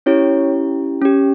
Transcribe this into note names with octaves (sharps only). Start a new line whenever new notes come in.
C#4 E4 G4 C#5
C#4 G4